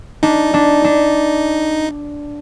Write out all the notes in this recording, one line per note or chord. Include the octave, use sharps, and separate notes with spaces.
D4 D#4
D4
D4